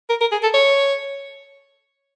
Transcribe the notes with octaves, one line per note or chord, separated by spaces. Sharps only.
A#4
A#4
G#4
A4
C#5